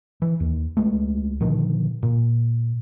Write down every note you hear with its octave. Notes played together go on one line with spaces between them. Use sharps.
E3
D#2
C#2 G#3 A3
A#2 D3 D#3 F3
A#2